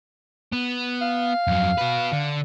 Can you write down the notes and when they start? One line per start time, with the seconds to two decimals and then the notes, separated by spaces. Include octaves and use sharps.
0.52 B3
1.01 F5
1.47 F2 F#3
1.78 F#4 B4
2.12 D3